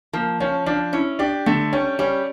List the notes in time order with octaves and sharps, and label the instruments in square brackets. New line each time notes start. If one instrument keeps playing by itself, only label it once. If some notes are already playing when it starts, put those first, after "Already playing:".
[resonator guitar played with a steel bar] F3 [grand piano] A#3
[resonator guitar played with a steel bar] F3 [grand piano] C#4
[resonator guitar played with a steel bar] F3 [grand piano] D4
[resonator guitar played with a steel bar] C#4 [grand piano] E4
[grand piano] D4 [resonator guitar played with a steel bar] G4
[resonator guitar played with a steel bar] D3 [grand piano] A3
[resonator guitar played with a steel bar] G3 [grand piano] C#4
[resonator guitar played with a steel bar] G3 [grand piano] C#4